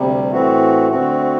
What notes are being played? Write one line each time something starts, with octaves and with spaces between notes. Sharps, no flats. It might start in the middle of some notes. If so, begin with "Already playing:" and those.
Already playing: D2 C3 G3
A2 E3 A3 C4 F#4
D2 D3 A3 C4 F#4